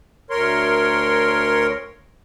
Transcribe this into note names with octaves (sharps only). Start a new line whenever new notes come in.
D2 A#4 C#5 C6